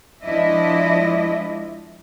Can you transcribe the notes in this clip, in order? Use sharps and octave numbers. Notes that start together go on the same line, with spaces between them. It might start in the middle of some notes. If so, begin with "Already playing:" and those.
F3 G#3 D4 E4 D#5 E5